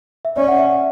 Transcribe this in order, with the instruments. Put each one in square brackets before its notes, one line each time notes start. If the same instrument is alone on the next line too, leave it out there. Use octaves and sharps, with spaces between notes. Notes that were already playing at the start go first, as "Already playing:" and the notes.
[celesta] E5
[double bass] C#4 [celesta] D5
[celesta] F#5
E5